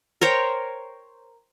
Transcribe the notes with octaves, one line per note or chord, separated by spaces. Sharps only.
A#4 C5 C#5 G5